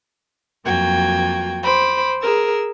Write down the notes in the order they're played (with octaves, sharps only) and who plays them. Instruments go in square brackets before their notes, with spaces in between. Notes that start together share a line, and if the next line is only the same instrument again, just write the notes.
[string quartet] F2 F#3 A#3 F#4 G5 G#6
C5 B5 D6
G#4 A#4 E6